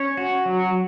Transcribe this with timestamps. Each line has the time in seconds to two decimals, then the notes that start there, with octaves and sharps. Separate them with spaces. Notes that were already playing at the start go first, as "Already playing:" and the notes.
Already playing: C#4 C#5
0.17 F#4
0.46 F#3